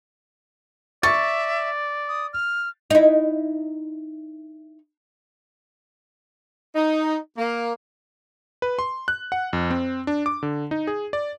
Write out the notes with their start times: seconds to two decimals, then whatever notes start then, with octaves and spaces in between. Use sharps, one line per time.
1.03 D5 E5 C#6 A6
2.08 D#6
2.33 F6
2.90 D#4 E4
6.76 D#4
7.38 A#3
8.62 B4
8.79 C6
9.08 F#6
9.32 F#5
9.53 F2
9.71 C4
10.07 D4
10.26 D6
10.43 D3
10.71 D#4
10.87 G#4
11.13 D5